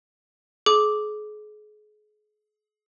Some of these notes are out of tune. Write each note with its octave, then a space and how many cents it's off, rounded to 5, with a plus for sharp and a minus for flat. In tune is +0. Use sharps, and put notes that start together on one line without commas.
G#4 +35 D6 +0